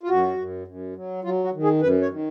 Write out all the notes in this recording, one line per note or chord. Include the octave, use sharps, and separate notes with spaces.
F4
F#2 F#4
F#2
F#2
F#3
F#3 F4
F#4
D#3
G#4
F#2 B4
C#5
D#3